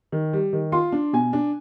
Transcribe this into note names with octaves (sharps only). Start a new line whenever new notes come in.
D#3
G3
D#3
F4 C6
D4
B2 G#5
D4